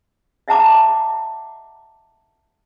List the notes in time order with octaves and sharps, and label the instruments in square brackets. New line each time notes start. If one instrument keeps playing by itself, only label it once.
[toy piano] D#5 E5 F#5 A5 A#5 D6